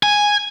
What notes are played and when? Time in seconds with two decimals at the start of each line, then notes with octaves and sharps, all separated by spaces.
0.03 G#5